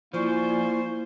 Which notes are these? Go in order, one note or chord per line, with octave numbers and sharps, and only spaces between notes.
F3 A#3 E4 C5 D5 G#5 C#6